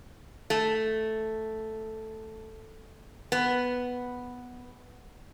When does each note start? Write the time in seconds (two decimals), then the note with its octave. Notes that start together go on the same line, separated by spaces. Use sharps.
0.50 A3
3.32 B3